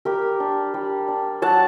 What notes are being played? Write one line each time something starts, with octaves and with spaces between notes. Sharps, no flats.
G3 G4 A#4
D4
G3
D4
F#3 F#5 A5